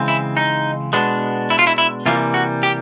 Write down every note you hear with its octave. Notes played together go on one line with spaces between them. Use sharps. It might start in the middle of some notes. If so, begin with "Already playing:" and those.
Already playing: C#3 E3 G#3 C4
E4
D#4
B2 G#3 B3 D4
E4
F4
E4
E4
C3 E3 G3 A#3 F4
F#4
G4